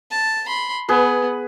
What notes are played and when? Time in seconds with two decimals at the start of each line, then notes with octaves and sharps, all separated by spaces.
0.11 A5
0.47 B5 C6
0.89 B3 G#4 B4